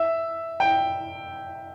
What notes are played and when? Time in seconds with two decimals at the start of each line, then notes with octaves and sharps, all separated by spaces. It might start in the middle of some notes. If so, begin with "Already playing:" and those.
Already playing: E5
0.60 G5